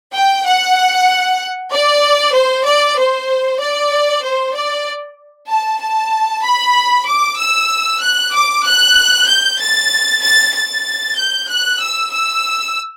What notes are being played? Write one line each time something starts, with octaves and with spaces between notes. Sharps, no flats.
G5
F#5
D5
C5
D5
C5
D5
C5
D5
A5
A5
B5
D6
E6
F#6
D6
F#6
G6
A6
A6
A6
G6
F#6
E6
E6